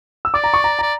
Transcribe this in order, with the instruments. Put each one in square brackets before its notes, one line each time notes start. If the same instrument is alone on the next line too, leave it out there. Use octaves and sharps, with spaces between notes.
[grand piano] E6
[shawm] D5 [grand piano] D6
[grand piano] A#5
C#6
A#5
[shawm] D5 [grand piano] A#5